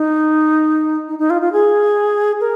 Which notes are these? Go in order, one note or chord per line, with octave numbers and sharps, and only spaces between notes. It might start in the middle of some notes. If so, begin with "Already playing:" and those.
Already playing: D#4
D#4
D#4
F4
F4
G#4
A#4